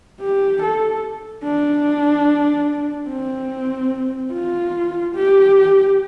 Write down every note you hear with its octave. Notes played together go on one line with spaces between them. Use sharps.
G4
A4
D4
C4
F4
G4